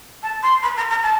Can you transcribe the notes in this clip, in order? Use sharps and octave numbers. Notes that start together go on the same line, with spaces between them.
A5
C6
B5
A#5
A#5
A5